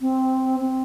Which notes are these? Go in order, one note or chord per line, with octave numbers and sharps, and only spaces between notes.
C4
C4